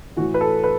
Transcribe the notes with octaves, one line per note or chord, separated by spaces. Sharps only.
A2 E3 F#4
B4
A4
B4